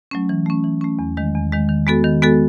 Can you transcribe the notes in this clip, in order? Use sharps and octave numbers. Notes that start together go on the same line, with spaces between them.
F#3 A3 C#4
E3
A3 C#4
E3
A3 C#4
E2
D#3 G#3
E2
D#3 G#3
D#3
G#3 B3 F#4 A4
D#3
G#3 B3 F#4 A4